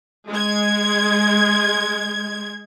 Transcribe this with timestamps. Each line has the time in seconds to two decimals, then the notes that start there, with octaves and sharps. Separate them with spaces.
0.30 G#3 G#6